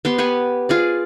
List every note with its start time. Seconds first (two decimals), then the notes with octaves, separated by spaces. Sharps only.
0.05 B3 G4 C6
0.18 G4 B4 F#5 G#5
0.69 F4 G#4 D5